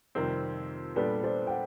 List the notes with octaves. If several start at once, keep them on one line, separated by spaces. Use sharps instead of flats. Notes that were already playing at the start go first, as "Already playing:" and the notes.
F2 C3 D#3 G3 C4 A#4
A#2 G3 B3 D4 A4 B4
C5 D5
G5
F#5